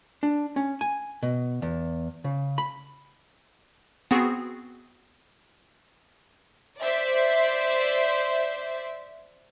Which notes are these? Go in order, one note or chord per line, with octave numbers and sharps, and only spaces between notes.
D4
C#4
G#5
B2
E2
C#3
B5
B3 C4 F#4 G#4
C5 D5 E5